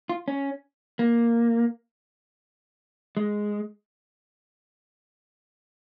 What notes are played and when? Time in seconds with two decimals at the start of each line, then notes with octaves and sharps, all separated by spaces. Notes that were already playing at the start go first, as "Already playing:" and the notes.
0.09 F4
0.28 C#4
0.99 A#3
3.17 G#3